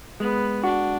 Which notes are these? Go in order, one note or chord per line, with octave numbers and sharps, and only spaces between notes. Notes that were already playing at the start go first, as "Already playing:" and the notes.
G#3 B3
D4 F#4